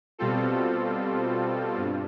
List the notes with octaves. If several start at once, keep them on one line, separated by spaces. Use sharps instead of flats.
B2 G3 C4 F4 A4
G2